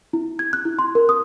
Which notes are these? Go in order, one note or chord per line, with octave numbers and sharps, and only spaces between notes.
E4
G#6
F#6
E4
C6
A#4
D#6